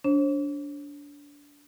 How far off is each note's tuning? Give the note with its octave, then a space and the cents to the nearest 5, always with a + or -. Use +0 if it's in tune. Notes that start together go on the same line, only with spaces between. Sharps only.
D4 -25 C5 +45